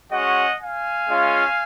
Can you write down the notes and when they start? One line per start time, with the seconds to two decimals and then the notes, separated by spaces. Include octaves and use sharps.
0.12 G#3 C#4 F#4 D#5 F#5
0.61 F5 G#5
1.10 G#3 C#4 F4